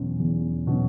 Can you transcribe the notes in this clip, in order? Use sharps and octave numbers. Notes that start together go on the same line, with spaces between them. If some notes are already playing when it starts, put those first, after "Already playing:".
Already playing: E2 B2 F#3 C#4
E2
B2 F#3 C#4